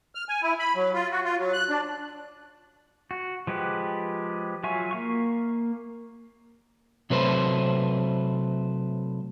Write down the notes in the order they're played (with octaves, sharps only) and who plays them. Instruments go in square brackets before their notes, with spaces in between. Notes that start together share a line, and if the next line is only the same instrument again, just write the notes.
[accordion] F6
G#5
E4
B5
F#3
F4
F#4
F4
F#3
F#6
D4
[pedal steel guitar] F#4
F3 G#3 G4 B4
F#3 F4 E5 G#5 C#6
A#3 F5 C#6
[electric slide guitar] C3 F#3 A3 B4 C5